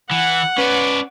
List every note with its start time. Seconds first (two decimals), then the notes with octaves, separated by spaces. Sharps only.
0.11 E3 F#5
0.58 C#4 B4 D5